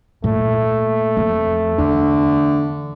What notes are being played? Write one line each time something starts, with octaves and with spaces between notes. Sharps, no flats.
A#2 A3
F2
E2 D3